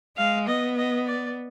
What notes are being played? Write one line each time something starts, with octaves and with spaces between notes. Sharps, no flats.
G#3 F5
B3 D#5
D#5
D5